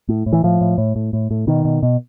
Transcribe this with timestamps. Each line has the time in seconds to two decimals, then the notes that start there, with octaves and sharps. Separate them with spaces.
0.09 A2
0.26 A2
0.33 E3
0.43 A2 F3
0.61 A2
0.78 A2
0.96 A2
1.13 A2
1.31 A2
1.47 B2 D#3
1.65 B2
1.83 B2